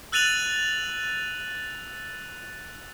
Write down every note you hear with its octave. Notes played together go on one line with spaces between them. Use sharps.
E6 F#6 A6 D#7 F7 F#7